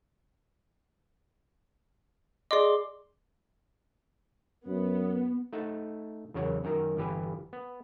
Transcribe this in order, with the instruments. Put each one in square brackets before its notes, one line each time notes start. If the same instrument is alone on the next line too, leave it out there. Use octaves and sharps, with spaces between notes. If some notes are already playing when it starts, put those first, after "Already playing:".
[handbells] G#4 C6 D6 [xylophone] D5 D#5
[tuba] F#2 [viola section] B3
[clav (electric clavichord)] A3 D#4 E5 F#5
E2 C#3 F#3 A#4 C#5 F#5
F#2 D#3 A#4 A#5
G1 E3 G4 B4 G#5
B3